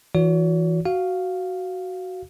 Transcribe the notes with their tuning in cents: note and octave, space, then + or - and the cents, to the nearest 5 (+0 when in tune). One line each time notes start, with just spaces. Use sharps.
E3 +0 F#4 -25 C#5 +45
F#4 +5 F5 +0